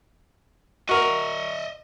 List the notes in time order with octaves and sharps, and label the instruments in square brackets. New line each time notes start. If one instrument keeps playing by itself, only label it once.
[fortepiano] F#4 A#4 [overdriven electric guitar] D#5 E5